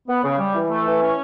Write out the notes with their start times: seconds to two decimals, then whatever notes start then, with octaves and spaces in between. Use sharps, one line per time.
0.08 B3
0.24 C#3
0.39 G3
0.55 E3
0.70 A3
0.86 E3
1.02 C#4